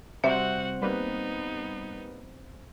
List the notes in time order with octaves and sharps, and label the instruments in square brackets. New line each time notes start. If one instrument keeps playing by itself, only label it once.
[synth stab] C3 G3 [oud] C4 C5 [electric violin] F#4 F#5 [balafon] E5
[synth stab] G3 A#3 B4 [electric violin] B3 D#4